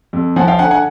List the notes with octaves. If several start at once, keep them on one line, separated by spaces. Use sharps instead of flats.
F2
F3 F#5 G#5
F5 G5
D3 F#5 G#5
F#5 G#5